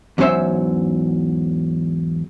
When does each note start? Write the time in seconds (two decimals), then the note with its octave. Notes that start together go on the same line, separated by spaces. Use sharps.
0.18 E2 G#2 F#3 C#4 C5 E5